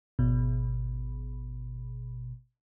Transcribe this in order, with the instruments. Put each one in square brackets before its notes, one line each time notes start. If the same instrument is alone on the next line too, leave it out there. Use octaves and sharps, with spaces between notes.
[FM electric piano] G#1 B2